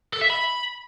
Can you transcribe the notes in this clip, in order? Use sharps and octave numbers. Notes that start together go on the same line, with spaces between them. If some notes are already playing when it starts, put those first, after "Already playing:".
A4
E5
B5